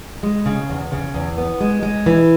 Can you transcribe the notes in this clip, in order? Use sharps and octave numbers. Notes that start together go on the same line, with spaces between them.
G#3
C#3
E2
C#3
E2
B3
G#3
G#3
E3